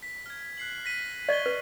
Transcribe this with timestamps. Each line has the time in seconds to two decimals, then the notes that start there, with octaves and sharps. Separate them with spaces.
0.02 B6
0.26 F6 G#6
0.57 F#6 C7 F#7
0.85 A#6 B6 D#7
1.29 D5 D#5 C#6 G7
1.46 B4